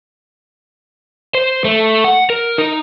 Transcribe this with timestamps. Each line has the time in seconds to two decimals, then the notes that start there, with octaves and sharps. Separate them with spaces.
1.35 C5
1.65 A3
2.05 F#5
2.30 A#4
2.58 D#4